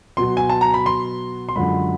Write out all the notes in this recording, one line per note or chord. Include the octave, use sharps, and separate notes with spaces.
B2 F#3 C6
G#5
A5
A#5
B5
C6
C6
F#2 D3 F3 G#3 B5